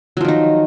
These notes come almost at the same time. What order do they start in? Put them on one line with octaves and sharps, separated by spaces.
F#3 F3 D#3 D#4